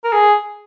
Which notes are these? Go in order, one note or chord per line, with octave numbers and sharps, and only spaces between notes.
A#4
G#4